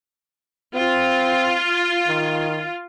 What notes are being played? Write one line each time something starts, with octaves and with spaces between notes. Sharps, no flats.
C4 F4
D#3